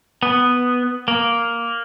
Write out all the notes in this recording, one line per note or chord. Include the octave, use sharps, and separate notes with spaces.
B3
A#3